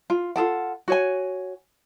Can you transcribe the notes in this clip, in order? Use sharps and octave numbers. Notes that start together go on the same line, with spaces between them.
F4
F4 G#4 A4 F#5
F#4 C#5 G#5